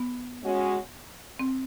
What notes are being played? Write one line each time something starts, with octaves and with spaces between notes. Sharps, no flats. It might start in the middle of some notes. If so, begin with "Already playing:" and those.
Already playing: B3
G#3 C#4 F#4
C4